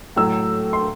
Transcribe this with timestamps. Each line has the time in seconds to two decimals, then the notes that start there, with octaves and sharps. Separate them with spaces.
0.16 A2 F#3 A3 E6
0.73 C6